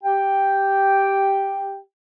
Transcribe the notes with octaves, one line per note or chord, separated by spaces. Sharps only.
G4 G5